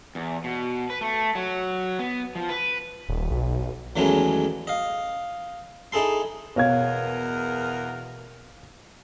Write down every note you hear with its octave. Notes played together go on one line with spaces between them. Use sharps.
E2
B2
B4
A3
F#3
B3
F3
B4
D#1
B1
E2 D#3 F#3 G#3 A3 C#4
D#5 F5
D#4 E4 G#4 A4 C6
E2 B2 G#4 A#4 C#5 F5 G#6